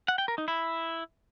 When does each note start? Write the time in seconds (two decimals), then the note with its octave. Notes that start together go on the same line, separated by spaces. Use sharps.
0.08 F#5
0.18 G5
0.28 A#4
0.38 D#4
0.48 E4